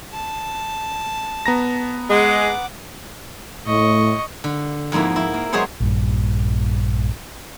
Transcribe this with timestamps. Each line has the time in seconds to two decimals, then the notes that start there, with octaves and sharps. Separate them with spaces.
0.12 A5
1.46 B3 A#5 A#6
2.09 G#3 F#5 D6
3.66 A2 D#5 C#6
4.44 D3
4.92 F2 G#2 A#3 B3 E4
5.16 E4
5.34 A#3
5.53 F#3 G#3 B3 G#4 C5 C#5
5.80 A#1 G2